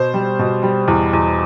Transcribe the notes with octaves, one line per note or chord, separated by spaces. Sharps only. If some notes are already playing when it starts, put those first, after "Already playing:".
Already playing: B2 C5
G3
B2
G3
E2
E2